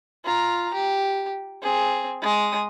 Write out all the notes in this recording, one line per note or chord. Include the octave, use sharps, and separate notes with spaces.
F4 A#5
G4
C4 G#4
G#3 D#6